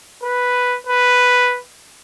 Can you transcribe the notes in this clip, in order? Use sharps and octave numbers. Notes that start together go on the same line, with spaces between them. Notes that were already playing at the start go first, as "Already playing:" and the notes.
B4
B4